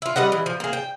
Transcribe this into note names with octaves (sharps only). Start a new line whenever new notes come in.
E4 F4
G3 B4 D#5 F#5
E3
F3
A#3 G#4
G5